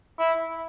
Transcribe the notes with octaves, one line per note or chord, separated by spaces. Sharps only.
E4